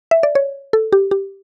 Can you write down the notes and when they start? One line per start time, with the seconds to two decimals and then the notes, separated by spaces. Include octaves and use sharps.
0.11 E5
0.23 D5
0.35 C#5
0.73 A4
0.93 G4
1.11 G4